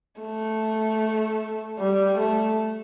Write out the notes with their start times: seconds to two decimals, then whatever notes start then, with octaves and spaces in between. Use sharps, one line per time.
0.21 A3
1.79 G3
2.18 A3